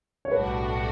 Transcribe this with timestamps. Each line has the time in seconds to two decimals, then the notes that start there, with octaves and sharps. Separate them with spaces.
0.25 C#5
0.31 B1 A2 G3 D4 F#4 B4